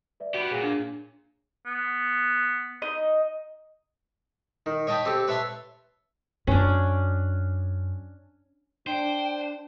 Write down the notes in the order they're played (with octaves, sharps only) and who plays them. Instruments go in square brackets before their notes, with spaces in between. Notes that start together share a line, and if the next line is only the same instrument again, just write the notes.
[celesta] B4 D5 E5
[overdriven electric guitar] B3 G4 [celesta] F#4 B5
[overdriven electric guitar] A#2 [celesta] G#4 C#5 C#7
[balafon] D4
[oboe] B3
[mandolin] D#4 D#5
[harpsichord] D#3
C#5 D#5 G5 A5 B5
C4 G4 A4
B4 C#5 E5 A5 C6
[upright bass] F#2 [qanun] C#4 D4
[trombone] D4 [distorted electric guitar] C5 [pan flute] G5